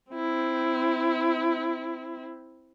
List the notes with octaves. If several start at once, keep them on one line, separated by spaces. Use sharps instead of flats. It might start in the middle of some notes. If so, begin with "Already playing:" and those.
C4 E4